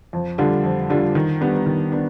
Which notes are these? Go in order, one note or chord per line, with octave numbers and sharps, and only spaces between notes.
F2
D3 G3 D4 F4
F2
D3 G3 D4 F4
D#3
G3 B3 D4
D#3
B3 D4